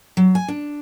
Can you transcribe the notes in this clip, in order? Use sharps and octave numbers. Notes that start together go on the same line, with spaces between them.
F#3
G#5
D4